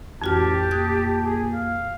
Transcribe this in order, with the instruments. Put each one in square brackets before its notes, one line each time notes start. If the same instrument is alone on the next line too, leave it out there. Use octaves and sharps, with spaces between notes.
[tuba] A1 [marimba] F2 F#4 F6 [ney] G4 [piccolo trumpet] A5
[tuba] A#2 [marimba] D#6 F#6 G#6
[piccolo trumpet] G#4
F5